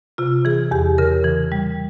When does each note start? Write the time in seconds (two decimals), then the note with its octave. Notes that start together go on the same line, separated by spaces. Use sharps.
0.18 C3 F4
0.45 E3 G#4
0.71 E2 G4
0.98 C#3 A#4
1.24 E3
1.52 G3